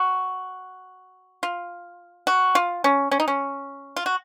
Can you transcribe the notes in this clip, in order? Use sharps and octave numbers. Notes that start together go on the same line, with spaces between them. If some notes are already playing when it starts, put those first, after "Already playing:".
Already playing: F#4
F4
F#4
F4
C#4
C#4
D#4
C#4
F4
F#4